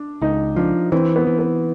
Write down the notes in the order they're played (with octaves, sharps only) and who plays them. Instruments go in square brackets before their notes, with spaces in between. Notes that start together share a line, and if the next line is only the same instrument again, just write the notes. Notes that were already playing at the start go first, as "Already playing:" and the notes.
Already playing: [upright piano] D4
[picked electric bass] C#2 [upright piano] D#4
[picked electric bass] F3 [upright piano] D4
[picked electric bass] E3 [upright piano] C4
[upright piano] B3
[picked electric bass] E3
[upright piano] B3